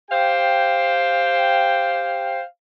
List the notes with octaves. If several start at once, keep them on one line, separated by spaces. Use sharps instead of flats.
G4 C5 F5 G5